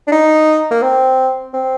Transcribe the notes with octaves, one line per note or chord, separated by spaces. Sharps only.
D4
D#4
A#3
C4
C4